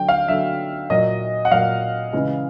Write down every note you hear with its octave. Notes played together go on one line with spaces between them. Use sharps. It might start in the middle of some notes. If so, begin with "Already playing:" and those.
Already playing: D3 F#3 G5
F5
D3 F#3 E5
A#2 F#3 D#5
F#5
A#2 F#3 F5
C#3 E3 G#3